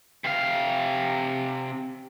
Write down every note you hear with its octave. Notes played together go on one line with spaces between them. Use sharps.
C3 F5